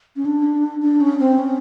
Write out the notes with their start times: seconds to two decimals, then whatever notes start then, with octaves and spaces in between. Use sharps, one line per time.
0.16 C#4
0.25 D4
0.82 D4
1.01 C#4
1.19 C4
1.38 C#4